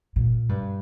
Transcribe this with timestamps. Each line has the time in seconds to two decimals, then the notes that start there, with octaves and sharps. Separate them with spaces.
0.16 A#2
0.49 G2